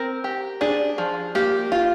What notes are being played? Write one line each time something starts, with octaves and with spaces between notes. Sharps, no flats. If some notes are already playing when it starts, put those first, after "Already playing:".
Already playing: C4 A#4
G4
D4 G#4
F3
A#3 G4
F4